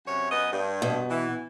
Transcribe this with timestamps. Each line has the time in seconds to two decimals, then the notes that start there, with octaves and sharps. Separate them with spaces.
0.05 F#2 C3 C#5
0.30 F#2 B3 D#5
0.51 G2
0.82 B2
1.10 E3